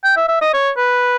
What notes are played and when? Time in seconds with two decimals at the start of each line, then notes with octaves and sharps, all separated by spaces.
0.04 G5
0.17 E5
0.28 E5
0.41 D#5
0.53 C#5
0.77 B4